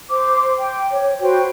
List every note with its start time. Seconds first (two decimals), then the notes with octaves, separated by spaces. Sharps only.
0.09 C5 D6
0.57 G5
0.89 C#5
1.22 F#4 B4 C5 G5